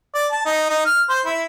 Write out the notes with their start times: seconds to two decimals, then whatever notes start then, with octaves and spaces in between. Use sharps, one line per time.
0.14 D5
0.31 A5
0.46 D#4
0.69 D#4
0.86 F6
1.09 C5
1.26 E4